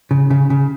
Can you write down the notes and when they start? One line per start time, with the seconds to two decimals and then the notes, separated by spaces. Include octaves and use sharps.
0.11 C#3
0.30 C#3
0.50 C#3